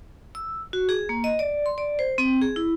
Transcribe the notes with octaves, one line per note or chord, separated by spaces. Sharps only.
E6
F#4
G#4
A#3
D#5
D5
C6
D5
C5
C4
G#4
E4